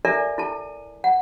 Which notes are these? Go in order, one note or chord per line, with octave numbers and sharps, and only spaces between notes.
E4 A4 A#4 D5 E5 G#5
E4 A4 A5
F#5